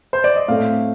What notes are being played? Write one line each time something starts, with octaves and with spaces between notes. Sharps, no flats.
C5
D5
D#5
A2 A3 C4 F5